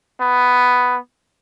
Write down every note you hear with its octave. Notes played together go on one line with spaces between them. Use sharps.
B3